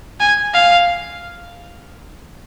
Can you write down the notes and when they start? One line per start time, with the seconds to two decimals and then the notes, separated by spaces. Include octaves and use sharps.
0.20 G#5
0.54 F5